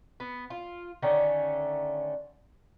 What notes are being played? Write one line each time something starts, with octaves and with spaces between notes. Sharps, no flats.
B3
F4
D3 D#3 A3 C#4